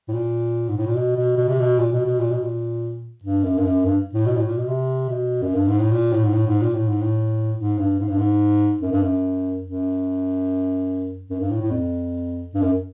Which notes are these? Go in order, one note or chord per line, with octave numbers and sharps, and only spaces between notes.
A2
A#2
G#2
A2
A#2
B2
B2
B2
C3
B2
A#2
B2
B2
A#2
B2
A#2
G2
F#2
G2
F#2
G2
A2
B2
A2
A#2
B2
C3
B2
F#2
G2
G#2
A2
A#2
A2
G#2
A2
G#2
A#2
A2
G#2
A2
G#2
G2
G#2
G2
G#2
F#2
G2
F#2
F#2
F#2
G2
A2
A2
F2
G2
F#2